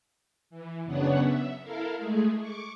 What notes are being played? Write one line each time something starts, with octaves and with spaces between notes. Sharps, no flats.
E3
F#2 C#3 B3 D4 C#5 F#5
E5
E4 A4 A#4 F5
G#3 A3 G#4
C#6 D6